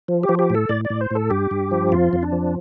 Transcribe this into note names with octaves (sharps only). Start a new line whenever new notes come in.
F3
G4
F3
G4
A2 A4
A2 D5
D5
A2
C5
A2 A4
G2 G4
G2
F3
F2 F4
F2
D4
F3